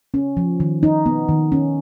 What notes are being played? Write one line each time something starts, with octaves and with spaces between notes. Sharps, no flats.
C#4
F3
D#3
D#4
B3
D#3
C#4